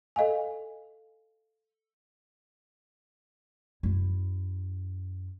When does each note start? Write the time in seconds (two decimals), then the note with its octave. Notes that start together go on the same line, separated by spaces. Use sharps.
0.16 A4 D#5 F5 G#5
3.83 F#2 E4